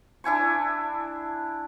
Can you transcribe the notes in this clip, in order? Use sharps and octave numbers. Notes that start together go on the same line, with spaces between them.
D4 E4 G#5 C#6